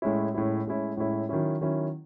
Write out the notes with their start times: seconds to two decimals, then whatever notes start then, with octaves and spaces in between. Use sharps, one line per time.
0.02 A2 G#3 C#4 E4
0.34 A2 G#3 C#4 E4
0.65 A2 G#3 C#4 E4
0.97 A2 G#3 C#4 E4
1.29 D#3 F#3 C#4 E4
1.61 D#3 F#3 C#4 E4